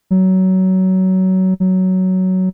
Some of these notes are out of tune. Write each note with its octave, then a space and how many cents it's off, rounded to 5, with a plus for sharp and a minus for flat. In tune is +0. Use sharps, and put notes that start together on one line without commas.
F#3 +20
F#3 +10